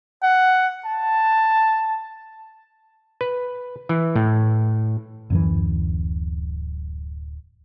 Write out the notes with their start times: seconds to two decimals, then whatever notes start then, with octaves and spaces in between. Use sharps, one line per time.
0.23 F#5
0.85 A5
3.21 B4
3.89 E3
4.16 A2
5.30 D1 F#2 E3